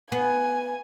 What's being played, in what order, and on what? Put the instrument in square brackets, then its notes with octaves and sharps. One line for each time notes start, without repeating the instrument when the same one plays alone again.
[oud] B3 [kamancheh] G#5